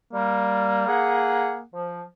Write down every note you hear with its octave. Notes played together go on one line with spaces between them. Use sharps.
G3 A#3
G#4 F#5
F3